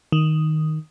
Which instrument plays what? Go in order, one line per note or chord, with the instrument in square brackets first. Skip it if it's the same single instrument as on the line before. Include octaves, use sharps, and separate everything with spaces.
[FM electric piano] D#3